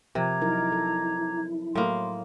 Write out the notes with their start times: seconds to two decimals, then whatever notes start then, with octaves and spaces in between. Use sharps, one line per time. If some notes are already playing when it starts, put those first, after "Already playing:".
0.15 C3 F3 A#4 A#5 D6 G#6
0.42 F#3 D#4 E4 A#4
0.72 A4
1.75 A2 F#3 A#3 C6